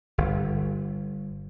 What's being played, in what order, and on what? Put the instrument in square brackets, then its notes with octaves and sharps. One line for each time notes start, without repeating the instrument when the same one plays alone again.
[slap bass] G1